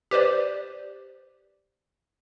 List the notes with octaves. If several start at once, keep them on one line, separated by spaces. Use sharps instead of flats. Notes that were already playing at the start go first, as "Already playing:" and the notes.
G4 B4 C5 D5